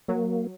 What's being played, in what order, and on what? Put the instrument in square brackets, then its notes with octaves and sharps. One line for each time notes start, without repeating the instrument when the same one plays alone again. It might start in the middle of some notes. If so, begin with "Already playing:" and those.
[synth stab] F#3 [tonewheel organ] A#3